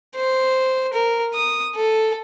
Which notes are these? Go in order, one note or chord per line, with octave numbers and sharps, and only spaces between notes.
C5
A#4
D#6
A4